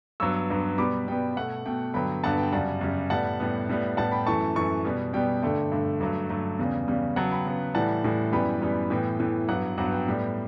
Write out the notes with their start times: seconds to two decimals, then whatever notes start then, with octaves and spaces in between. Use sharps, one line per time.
0.20 G2 F#3 B3 C#6 E6
0.50 G2 F#3 B3
0.78 B2 G3 B3 B5 D6
1.07 B2 G3 B3 G5
1.37 B2 A3 F#5
1.66 B2 A3 G5
1.94 G2 D3 F#3 B3 G5 B5
2.23 G2 D3 F#3 B3 F#5 A5
2.38 G5
2.52 F#2 C#3 G3 F#5 A5
2.81 F#2 C#3 G3
3.10 A2 G3 B3 F#5 A5
3.40 A2 G3 B3
3.69 A2 G3 B3
3.97 A2 G3 B3 F#5 A5
4.12 G5 B5
4.27 F#2 E3 A3 A5 C#6
4.56 F#2 E3 A3 A5 C#6
4.85 B2 G3 B3
5.13 B2 G3 B3 G5
5.43 G2 D3 A3 G5
5.72 G2 D3 A3
6.01 G2 F#3 A3
6.30 G2 F#3 A3
6.59 E2 C#3 G3
6.88 E2 C#3 G3
7.16 C#3 F#3 B3 F#5 A5
7.31 G5 B5
7.45 C#3 F#3 B3
7.75 A2 E3 G3 F#5 A5
8.04 A2 E3 G3
8.32 F#2 E3 G3 B3 G5 B5
8.61 F#2 E3 G3 B3
8.90 A2 E3 B3 G5
9.20 A2 E3 B3
9.48 G2 F#3 B3 F#5
9.78 G2 F#3 B3 F#5
9.93 G5
10.07 A2 G3 B3